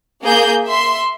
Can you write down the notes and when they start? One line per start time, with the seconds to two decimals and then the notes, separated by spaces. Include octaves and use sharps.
0.25 A#3 G#4 G6
0.66 E5 C6